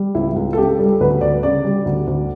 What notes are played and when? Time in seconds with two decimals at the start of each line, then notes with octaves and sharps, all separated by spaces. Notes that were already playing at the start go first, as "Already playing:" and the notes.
Already playing: G3
0.15 C#2 E4
0.36 C#2
0.53 A4
0.58 C#3 G4
0.79 G3 A4
1.00 D2 B4
1.21 D2 D5
1.43 C#3 D5
1.65 G3
1.86 D2
2.07 D2